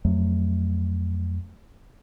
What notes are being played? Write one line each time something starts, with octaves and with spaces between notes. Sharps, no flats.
F2 F#3 A3